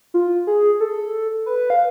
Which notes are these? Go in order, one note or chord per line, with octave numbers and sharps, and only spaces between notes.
F4
G#4
A4
B4
F5